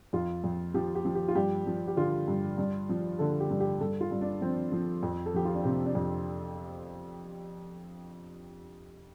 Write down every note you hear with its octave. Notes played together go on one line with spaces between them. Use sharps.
F2 F4
F2
F3 G4
G4
F3
G4
F4
G2 G4
F3
G4
D3 F4
G2
G2
F3
D3 A4
G4
G2
G4
G2 A4
F4
G2
D4
F3 C4
F3
F2
A4
F3 G4
F4
D4
C3 C4
D4
F2